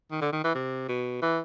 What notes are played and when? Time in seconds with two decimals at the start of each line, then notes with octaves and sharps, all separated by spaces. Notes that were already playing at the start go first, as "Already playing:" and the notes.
0.11 D#3
0.21 D3
0.32 D#3
0.44 E3
0.55 C3
0.88 B2
1.22 E3